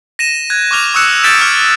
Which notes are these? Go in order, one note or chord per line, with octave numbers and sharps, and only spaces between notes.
A#6 D#7 E7
F#6 G#6
C#6 D6 F6 F7
C#6 D#6 E6 F#6 C#7 E7
F6 G6 A6 B6 D7 E7
D6 F6 G6 G#6